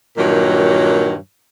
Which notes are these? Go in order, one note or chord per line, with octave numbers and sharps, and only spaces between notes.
G2 A#2 D#3 F#3